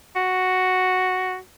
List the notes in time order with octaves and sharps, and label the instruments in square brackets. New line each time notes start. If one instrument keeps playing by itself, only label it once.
[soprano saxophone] F#4